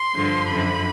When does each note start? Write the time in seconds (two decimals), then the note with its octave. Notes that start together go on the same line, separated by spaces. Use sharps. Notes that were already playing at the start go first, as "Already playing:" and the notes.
Already playing: C6
0.15 G2 D3 F3
0.49 F#2 D3 F3 B5